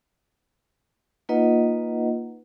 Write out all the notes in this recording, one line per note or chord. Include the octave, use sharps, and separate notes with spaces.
A#3 D#4 F4 B4 D#5 F#5